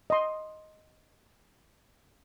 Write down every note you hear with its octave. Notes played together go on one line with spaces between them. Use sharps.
D#5 C6